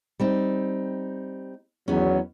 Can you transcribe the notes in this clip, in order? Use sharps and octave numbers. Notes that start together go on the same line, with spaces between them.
G3 C4 D#4
E2 D#3 F#3 B3 C#4